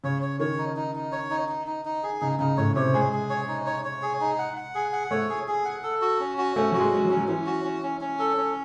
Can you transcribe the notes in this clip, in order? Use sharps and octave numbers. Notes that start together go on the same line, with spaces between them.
C#3 C#5
C#5
D#3 C#5
D#4
D#4
D#4
C#5
D#4
D#4
D#4
D#4
G#4
C#3 D#4
C#3 D#4
A2 C#5
C3 C#5
G#3 G#4
G#4
C#5
D#4
C#5
C#5
G#4
D#4
F#5
F#5
G#4
F#5
A3 C#5
G#4
G#4
F#5
A4
F#4
C#4
F#4
A3 C#4
F#3 F#4
G#3
C#4
F#3
C#4
F#3
E3 C#4
F#4
C#4
C#4
C#4
A4
C#4